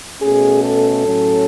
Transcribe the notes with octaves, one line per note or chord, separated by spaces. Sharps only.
B2 A3 C#4 G#4
A4
A2 F#3 C#4